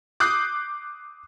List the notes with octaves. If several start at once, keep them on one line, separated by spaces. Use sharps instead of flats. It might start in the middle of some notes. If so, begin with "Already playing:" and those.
D6 D#6 F#6 G6 C7